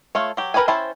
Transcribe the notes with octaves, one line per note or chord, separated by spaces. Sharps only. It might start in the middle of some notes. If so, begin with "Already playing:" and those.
A3 F4 C#5
F#3 G4
A#4 B4 D5 G5 G#5
C#4 E4 C5 G5 A5